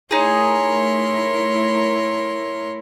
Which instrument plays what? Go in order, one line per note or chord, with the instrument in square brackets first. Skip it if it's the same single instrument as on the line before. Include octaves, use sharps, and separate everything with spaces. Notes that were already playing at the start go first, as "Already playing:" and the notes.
[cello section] A3 E4 A#4 [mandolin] D#4 G#4 [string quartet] C#5 C6